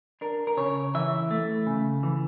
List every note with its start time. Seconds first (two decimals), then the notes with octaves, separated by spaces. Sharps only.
0.21 D4 A#4
0.47 A#4
0.57 C#3 C#5
0.94 E3 E5
1.31 A3
1.67 C#3
2.03 E3